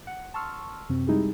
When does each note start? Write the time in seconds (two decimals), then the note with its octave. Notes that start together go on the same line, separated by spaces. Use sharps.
0.07 F#5
0.34 A5 C6 C#6 E6 F6
0.89 F#2 C3 C4
1.07 G3 G#3 D#4 E4 G4 G#4